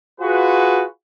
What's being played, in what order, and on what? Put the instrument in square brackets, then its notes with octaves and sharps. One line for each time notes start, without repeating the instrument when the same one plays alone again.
[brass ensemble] F4 F#4 G#4 B4